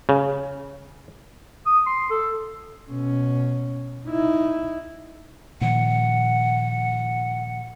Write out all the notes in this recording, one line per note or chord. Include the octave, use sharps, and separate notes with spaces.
C#3
D#6
C6
A4
B2 C#4
D#4 E4
A#2 D#3 F3 F#5